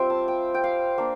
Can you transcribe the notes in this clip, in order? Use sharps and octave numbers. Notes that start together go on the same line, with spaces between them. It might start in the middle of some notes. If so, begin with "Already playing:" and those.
Already playing: G3 C4 F4 C5 E5 G5
A5
G5
G5
F5
A#3 D4